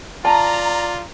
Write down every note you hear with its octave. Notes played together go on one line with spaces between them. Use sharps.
F4 D5 A5 A#5